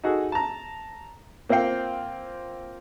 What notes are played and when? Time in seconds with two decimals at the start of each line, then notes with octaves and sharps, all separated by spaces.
0.04 D#4 F#4 G#4 A4
0.32 A5 A#5
1.49 A#3 C4 F4 F5 G5